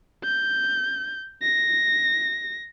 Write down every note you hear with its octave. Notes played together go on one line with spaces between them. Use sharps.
G6
A#6